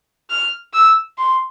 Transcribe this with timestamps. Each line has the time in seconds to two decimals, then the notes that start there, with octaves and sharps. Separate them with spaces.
0.30 F6
0.73 E6
1.18 C6